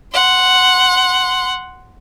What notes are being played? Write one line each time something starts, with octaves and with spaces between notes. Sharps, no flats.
F#5 C6